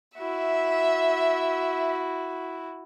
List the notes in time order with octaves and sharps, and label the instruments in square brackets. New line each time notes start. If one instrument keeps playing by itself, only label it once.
[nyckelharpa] E4 F#4 [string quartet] E5